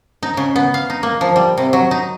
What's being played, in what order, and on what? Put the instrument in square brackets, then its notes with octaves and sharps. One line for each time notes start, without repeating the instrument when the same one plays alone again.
[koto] D#4
C#3
B3
F5
D#4
A#3
F3
G3
C3
F#3
D#4